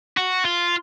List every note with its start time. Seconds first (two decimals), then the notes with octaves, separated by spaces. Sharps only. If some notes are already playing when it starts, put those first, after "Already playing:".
0.17 F#4
0.45 F4